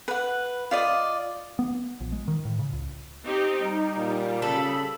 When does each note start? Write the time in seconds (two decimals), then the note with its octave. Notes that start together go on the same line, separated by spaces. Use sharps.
0.08 B4 F#5
0.71 F4 D5 D#5
1.59 B3
2.00 A#1
2.12 G#3
2.28 D#3
2.45 A2
2.59 C#3
2.73 C#2
3.25 C4 D#4 G4
3.61 G3 D#4
3.97 A#2
4.42 C#3 A4 B5